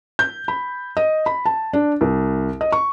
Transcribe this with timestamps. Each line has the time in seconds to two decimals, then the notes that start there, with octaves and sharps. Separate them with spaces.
0.19 G6
0.48 B5
0.97 D#5
1.26 B5
1.46 A5
1.73 D4
2.01 C2
2.61 D#5
2.72 C#6